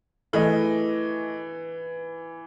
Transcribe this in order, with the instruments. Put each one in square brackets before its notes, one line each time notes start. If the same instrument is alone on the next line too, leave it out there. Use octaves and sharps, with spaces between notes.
[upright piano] E3 [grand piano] A3 E4 G#4 D#5